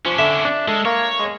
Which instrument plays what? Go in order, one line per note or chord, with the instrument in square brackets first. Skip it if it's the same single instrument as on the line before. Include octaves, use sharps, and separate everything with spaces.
[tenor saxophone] F3 [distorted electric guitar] C#4 D4
[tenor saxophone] D3 [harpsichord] E5
[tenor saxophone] D4
[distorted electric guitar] G#3 [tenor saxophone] A4
[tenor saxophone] A#3 [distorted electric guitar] C#5
[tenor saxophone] G#3